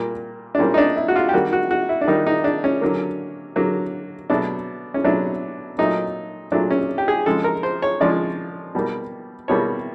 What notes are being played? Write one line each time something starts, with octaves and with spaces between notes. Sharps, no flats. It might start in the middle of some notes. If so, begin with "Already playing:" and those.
Already playing: A#2 G3 A#3
D4
A#2 G3 A#3 C#4
D#4
D4
E4
F#4
F4
G4
D#3 G3 A#3 F#4
F#4
F#4
E4
D4
D#3 G3 A#3 D#4
D#4
D4
C#4
D3 F#3 A#3
D3 F#3 A#3
B2 F#3 A3 D4
C#4
B2 F#3 A3 D4
A#2 F#3 A3 D#4
A#2 F#3 A3 D4
C#4
G4
G#4
C#3 F3 G#3 A4
A#4
C5
C#5
C#3 F3 G#3 D5
B2 G3 A#3
B2 G3 A#3 C#5